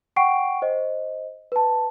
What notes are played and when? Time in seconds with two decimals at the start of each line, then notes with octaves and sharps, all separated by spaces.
0.16 F#5 G5 C#6 C7 D7
0.62 C5 D#5
1.52 B4 A5